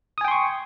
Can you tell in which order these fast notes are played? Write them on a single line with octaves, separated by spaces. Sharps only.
D#6 G#5 G5 C6 C#6